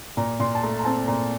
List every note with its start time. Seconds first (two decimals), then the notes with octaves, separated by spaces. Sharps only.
0.17 A#2 A#5
0.40 A#2 C6
0.55 A5
0.62 A3 A#5
0.79 A#5
0.85 C4 A5
1.08 A#2 A#5